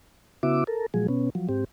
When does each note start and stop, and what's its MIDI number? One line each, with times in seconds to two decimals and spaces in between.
0.43 0.64 49
0.43 0.64 59
0.43 0.64 64
0.43 0.64 66
0.43 0.64 76
0.43 0.64 86
0.67 0.86 69
0.67 0.86 70
0.94 1.07 46
0.94 1.07 53
0.94 1.07 54
0.94 1.07 56
0.94 1.07 68
1.09 1.30 47
1.09 1.30 59
1.09 1.30 61
1.35 1.48 53
1.35 1.48 54
1.49 1.65 44
1.49 1.65 60
1.49 1.65 67